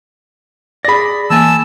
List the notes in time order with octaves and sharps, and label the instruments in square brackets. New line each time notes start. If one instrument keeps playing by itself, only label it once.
[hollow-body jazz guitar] G#4 D5 [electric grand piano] B5 A#6
[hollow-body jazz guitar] E3 A#3 G#5 [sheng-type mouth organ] A5 E6